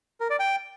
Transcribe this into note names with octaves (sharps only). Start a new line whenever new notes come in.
A#4
D5
G5